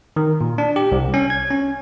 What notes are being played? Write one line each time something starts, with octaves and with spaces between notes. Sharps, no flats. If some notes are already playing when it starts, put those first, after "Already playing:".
D#3
A#2
D4
G4
C2
C#4
G#6
C#4